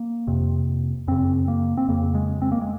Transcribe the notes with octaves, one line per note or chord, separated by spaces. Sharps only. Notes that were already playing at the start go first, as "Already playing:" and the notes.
Already playing: A#3
F2 C3
F#2 C#3 C4
A#3
C4
F2 C#3 A#3
G#3
C4
A#3
G#3